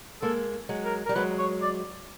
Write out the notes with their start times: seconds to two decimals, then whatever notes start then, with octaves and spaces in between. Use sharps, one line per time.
0.22 G#3 A#3 A4
0.69 F#3 G#3
0.85 A#4
1.06 G3 A#4
1.16 F#3 G#3 B4
1.39 C#5
1.62 D5